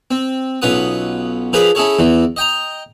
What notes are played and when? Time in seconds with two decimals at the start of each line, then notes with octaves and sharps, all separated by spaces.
0.11 C4
0.62 B1 C#4 F4 B4 F#5 D#6
1.53 F3 F4 G#4 A#4 B4 D5
1.75 C#4 E4 G#4 A4 C#5
1.99 E2 E3
2.36 D#5 G5 A#5